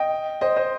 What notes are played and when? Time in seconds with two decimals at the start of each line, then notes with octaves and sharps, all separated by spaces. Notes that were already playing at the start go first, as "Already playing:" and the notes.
Already playing: D#5 G5
0.41 C5 D#5
0.56 C5 D#5